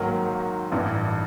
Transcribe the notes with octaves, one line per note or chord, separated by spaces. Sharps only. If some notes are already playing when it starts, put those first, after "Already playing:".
Already playing: G#2 D#3 F#3 A#3
A1 G2 E3